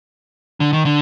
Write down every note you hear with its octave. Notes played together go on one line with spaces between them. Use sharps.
D3
D#3
D3